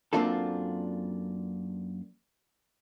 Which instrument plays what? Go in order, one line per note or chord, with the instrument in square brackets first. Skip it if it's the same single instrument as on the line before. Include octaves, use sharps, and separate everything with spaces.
[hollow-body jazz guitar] F#2 A#3 C4 D4 F4 A4